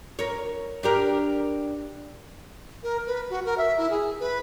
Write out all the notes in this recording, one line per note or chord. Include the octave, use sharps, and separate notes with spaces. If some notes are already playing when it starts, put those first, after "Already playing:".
A#4 C#5
D4 G4 A#4
A#4
B4
F#4
A#4
E5
E4
G#4
B4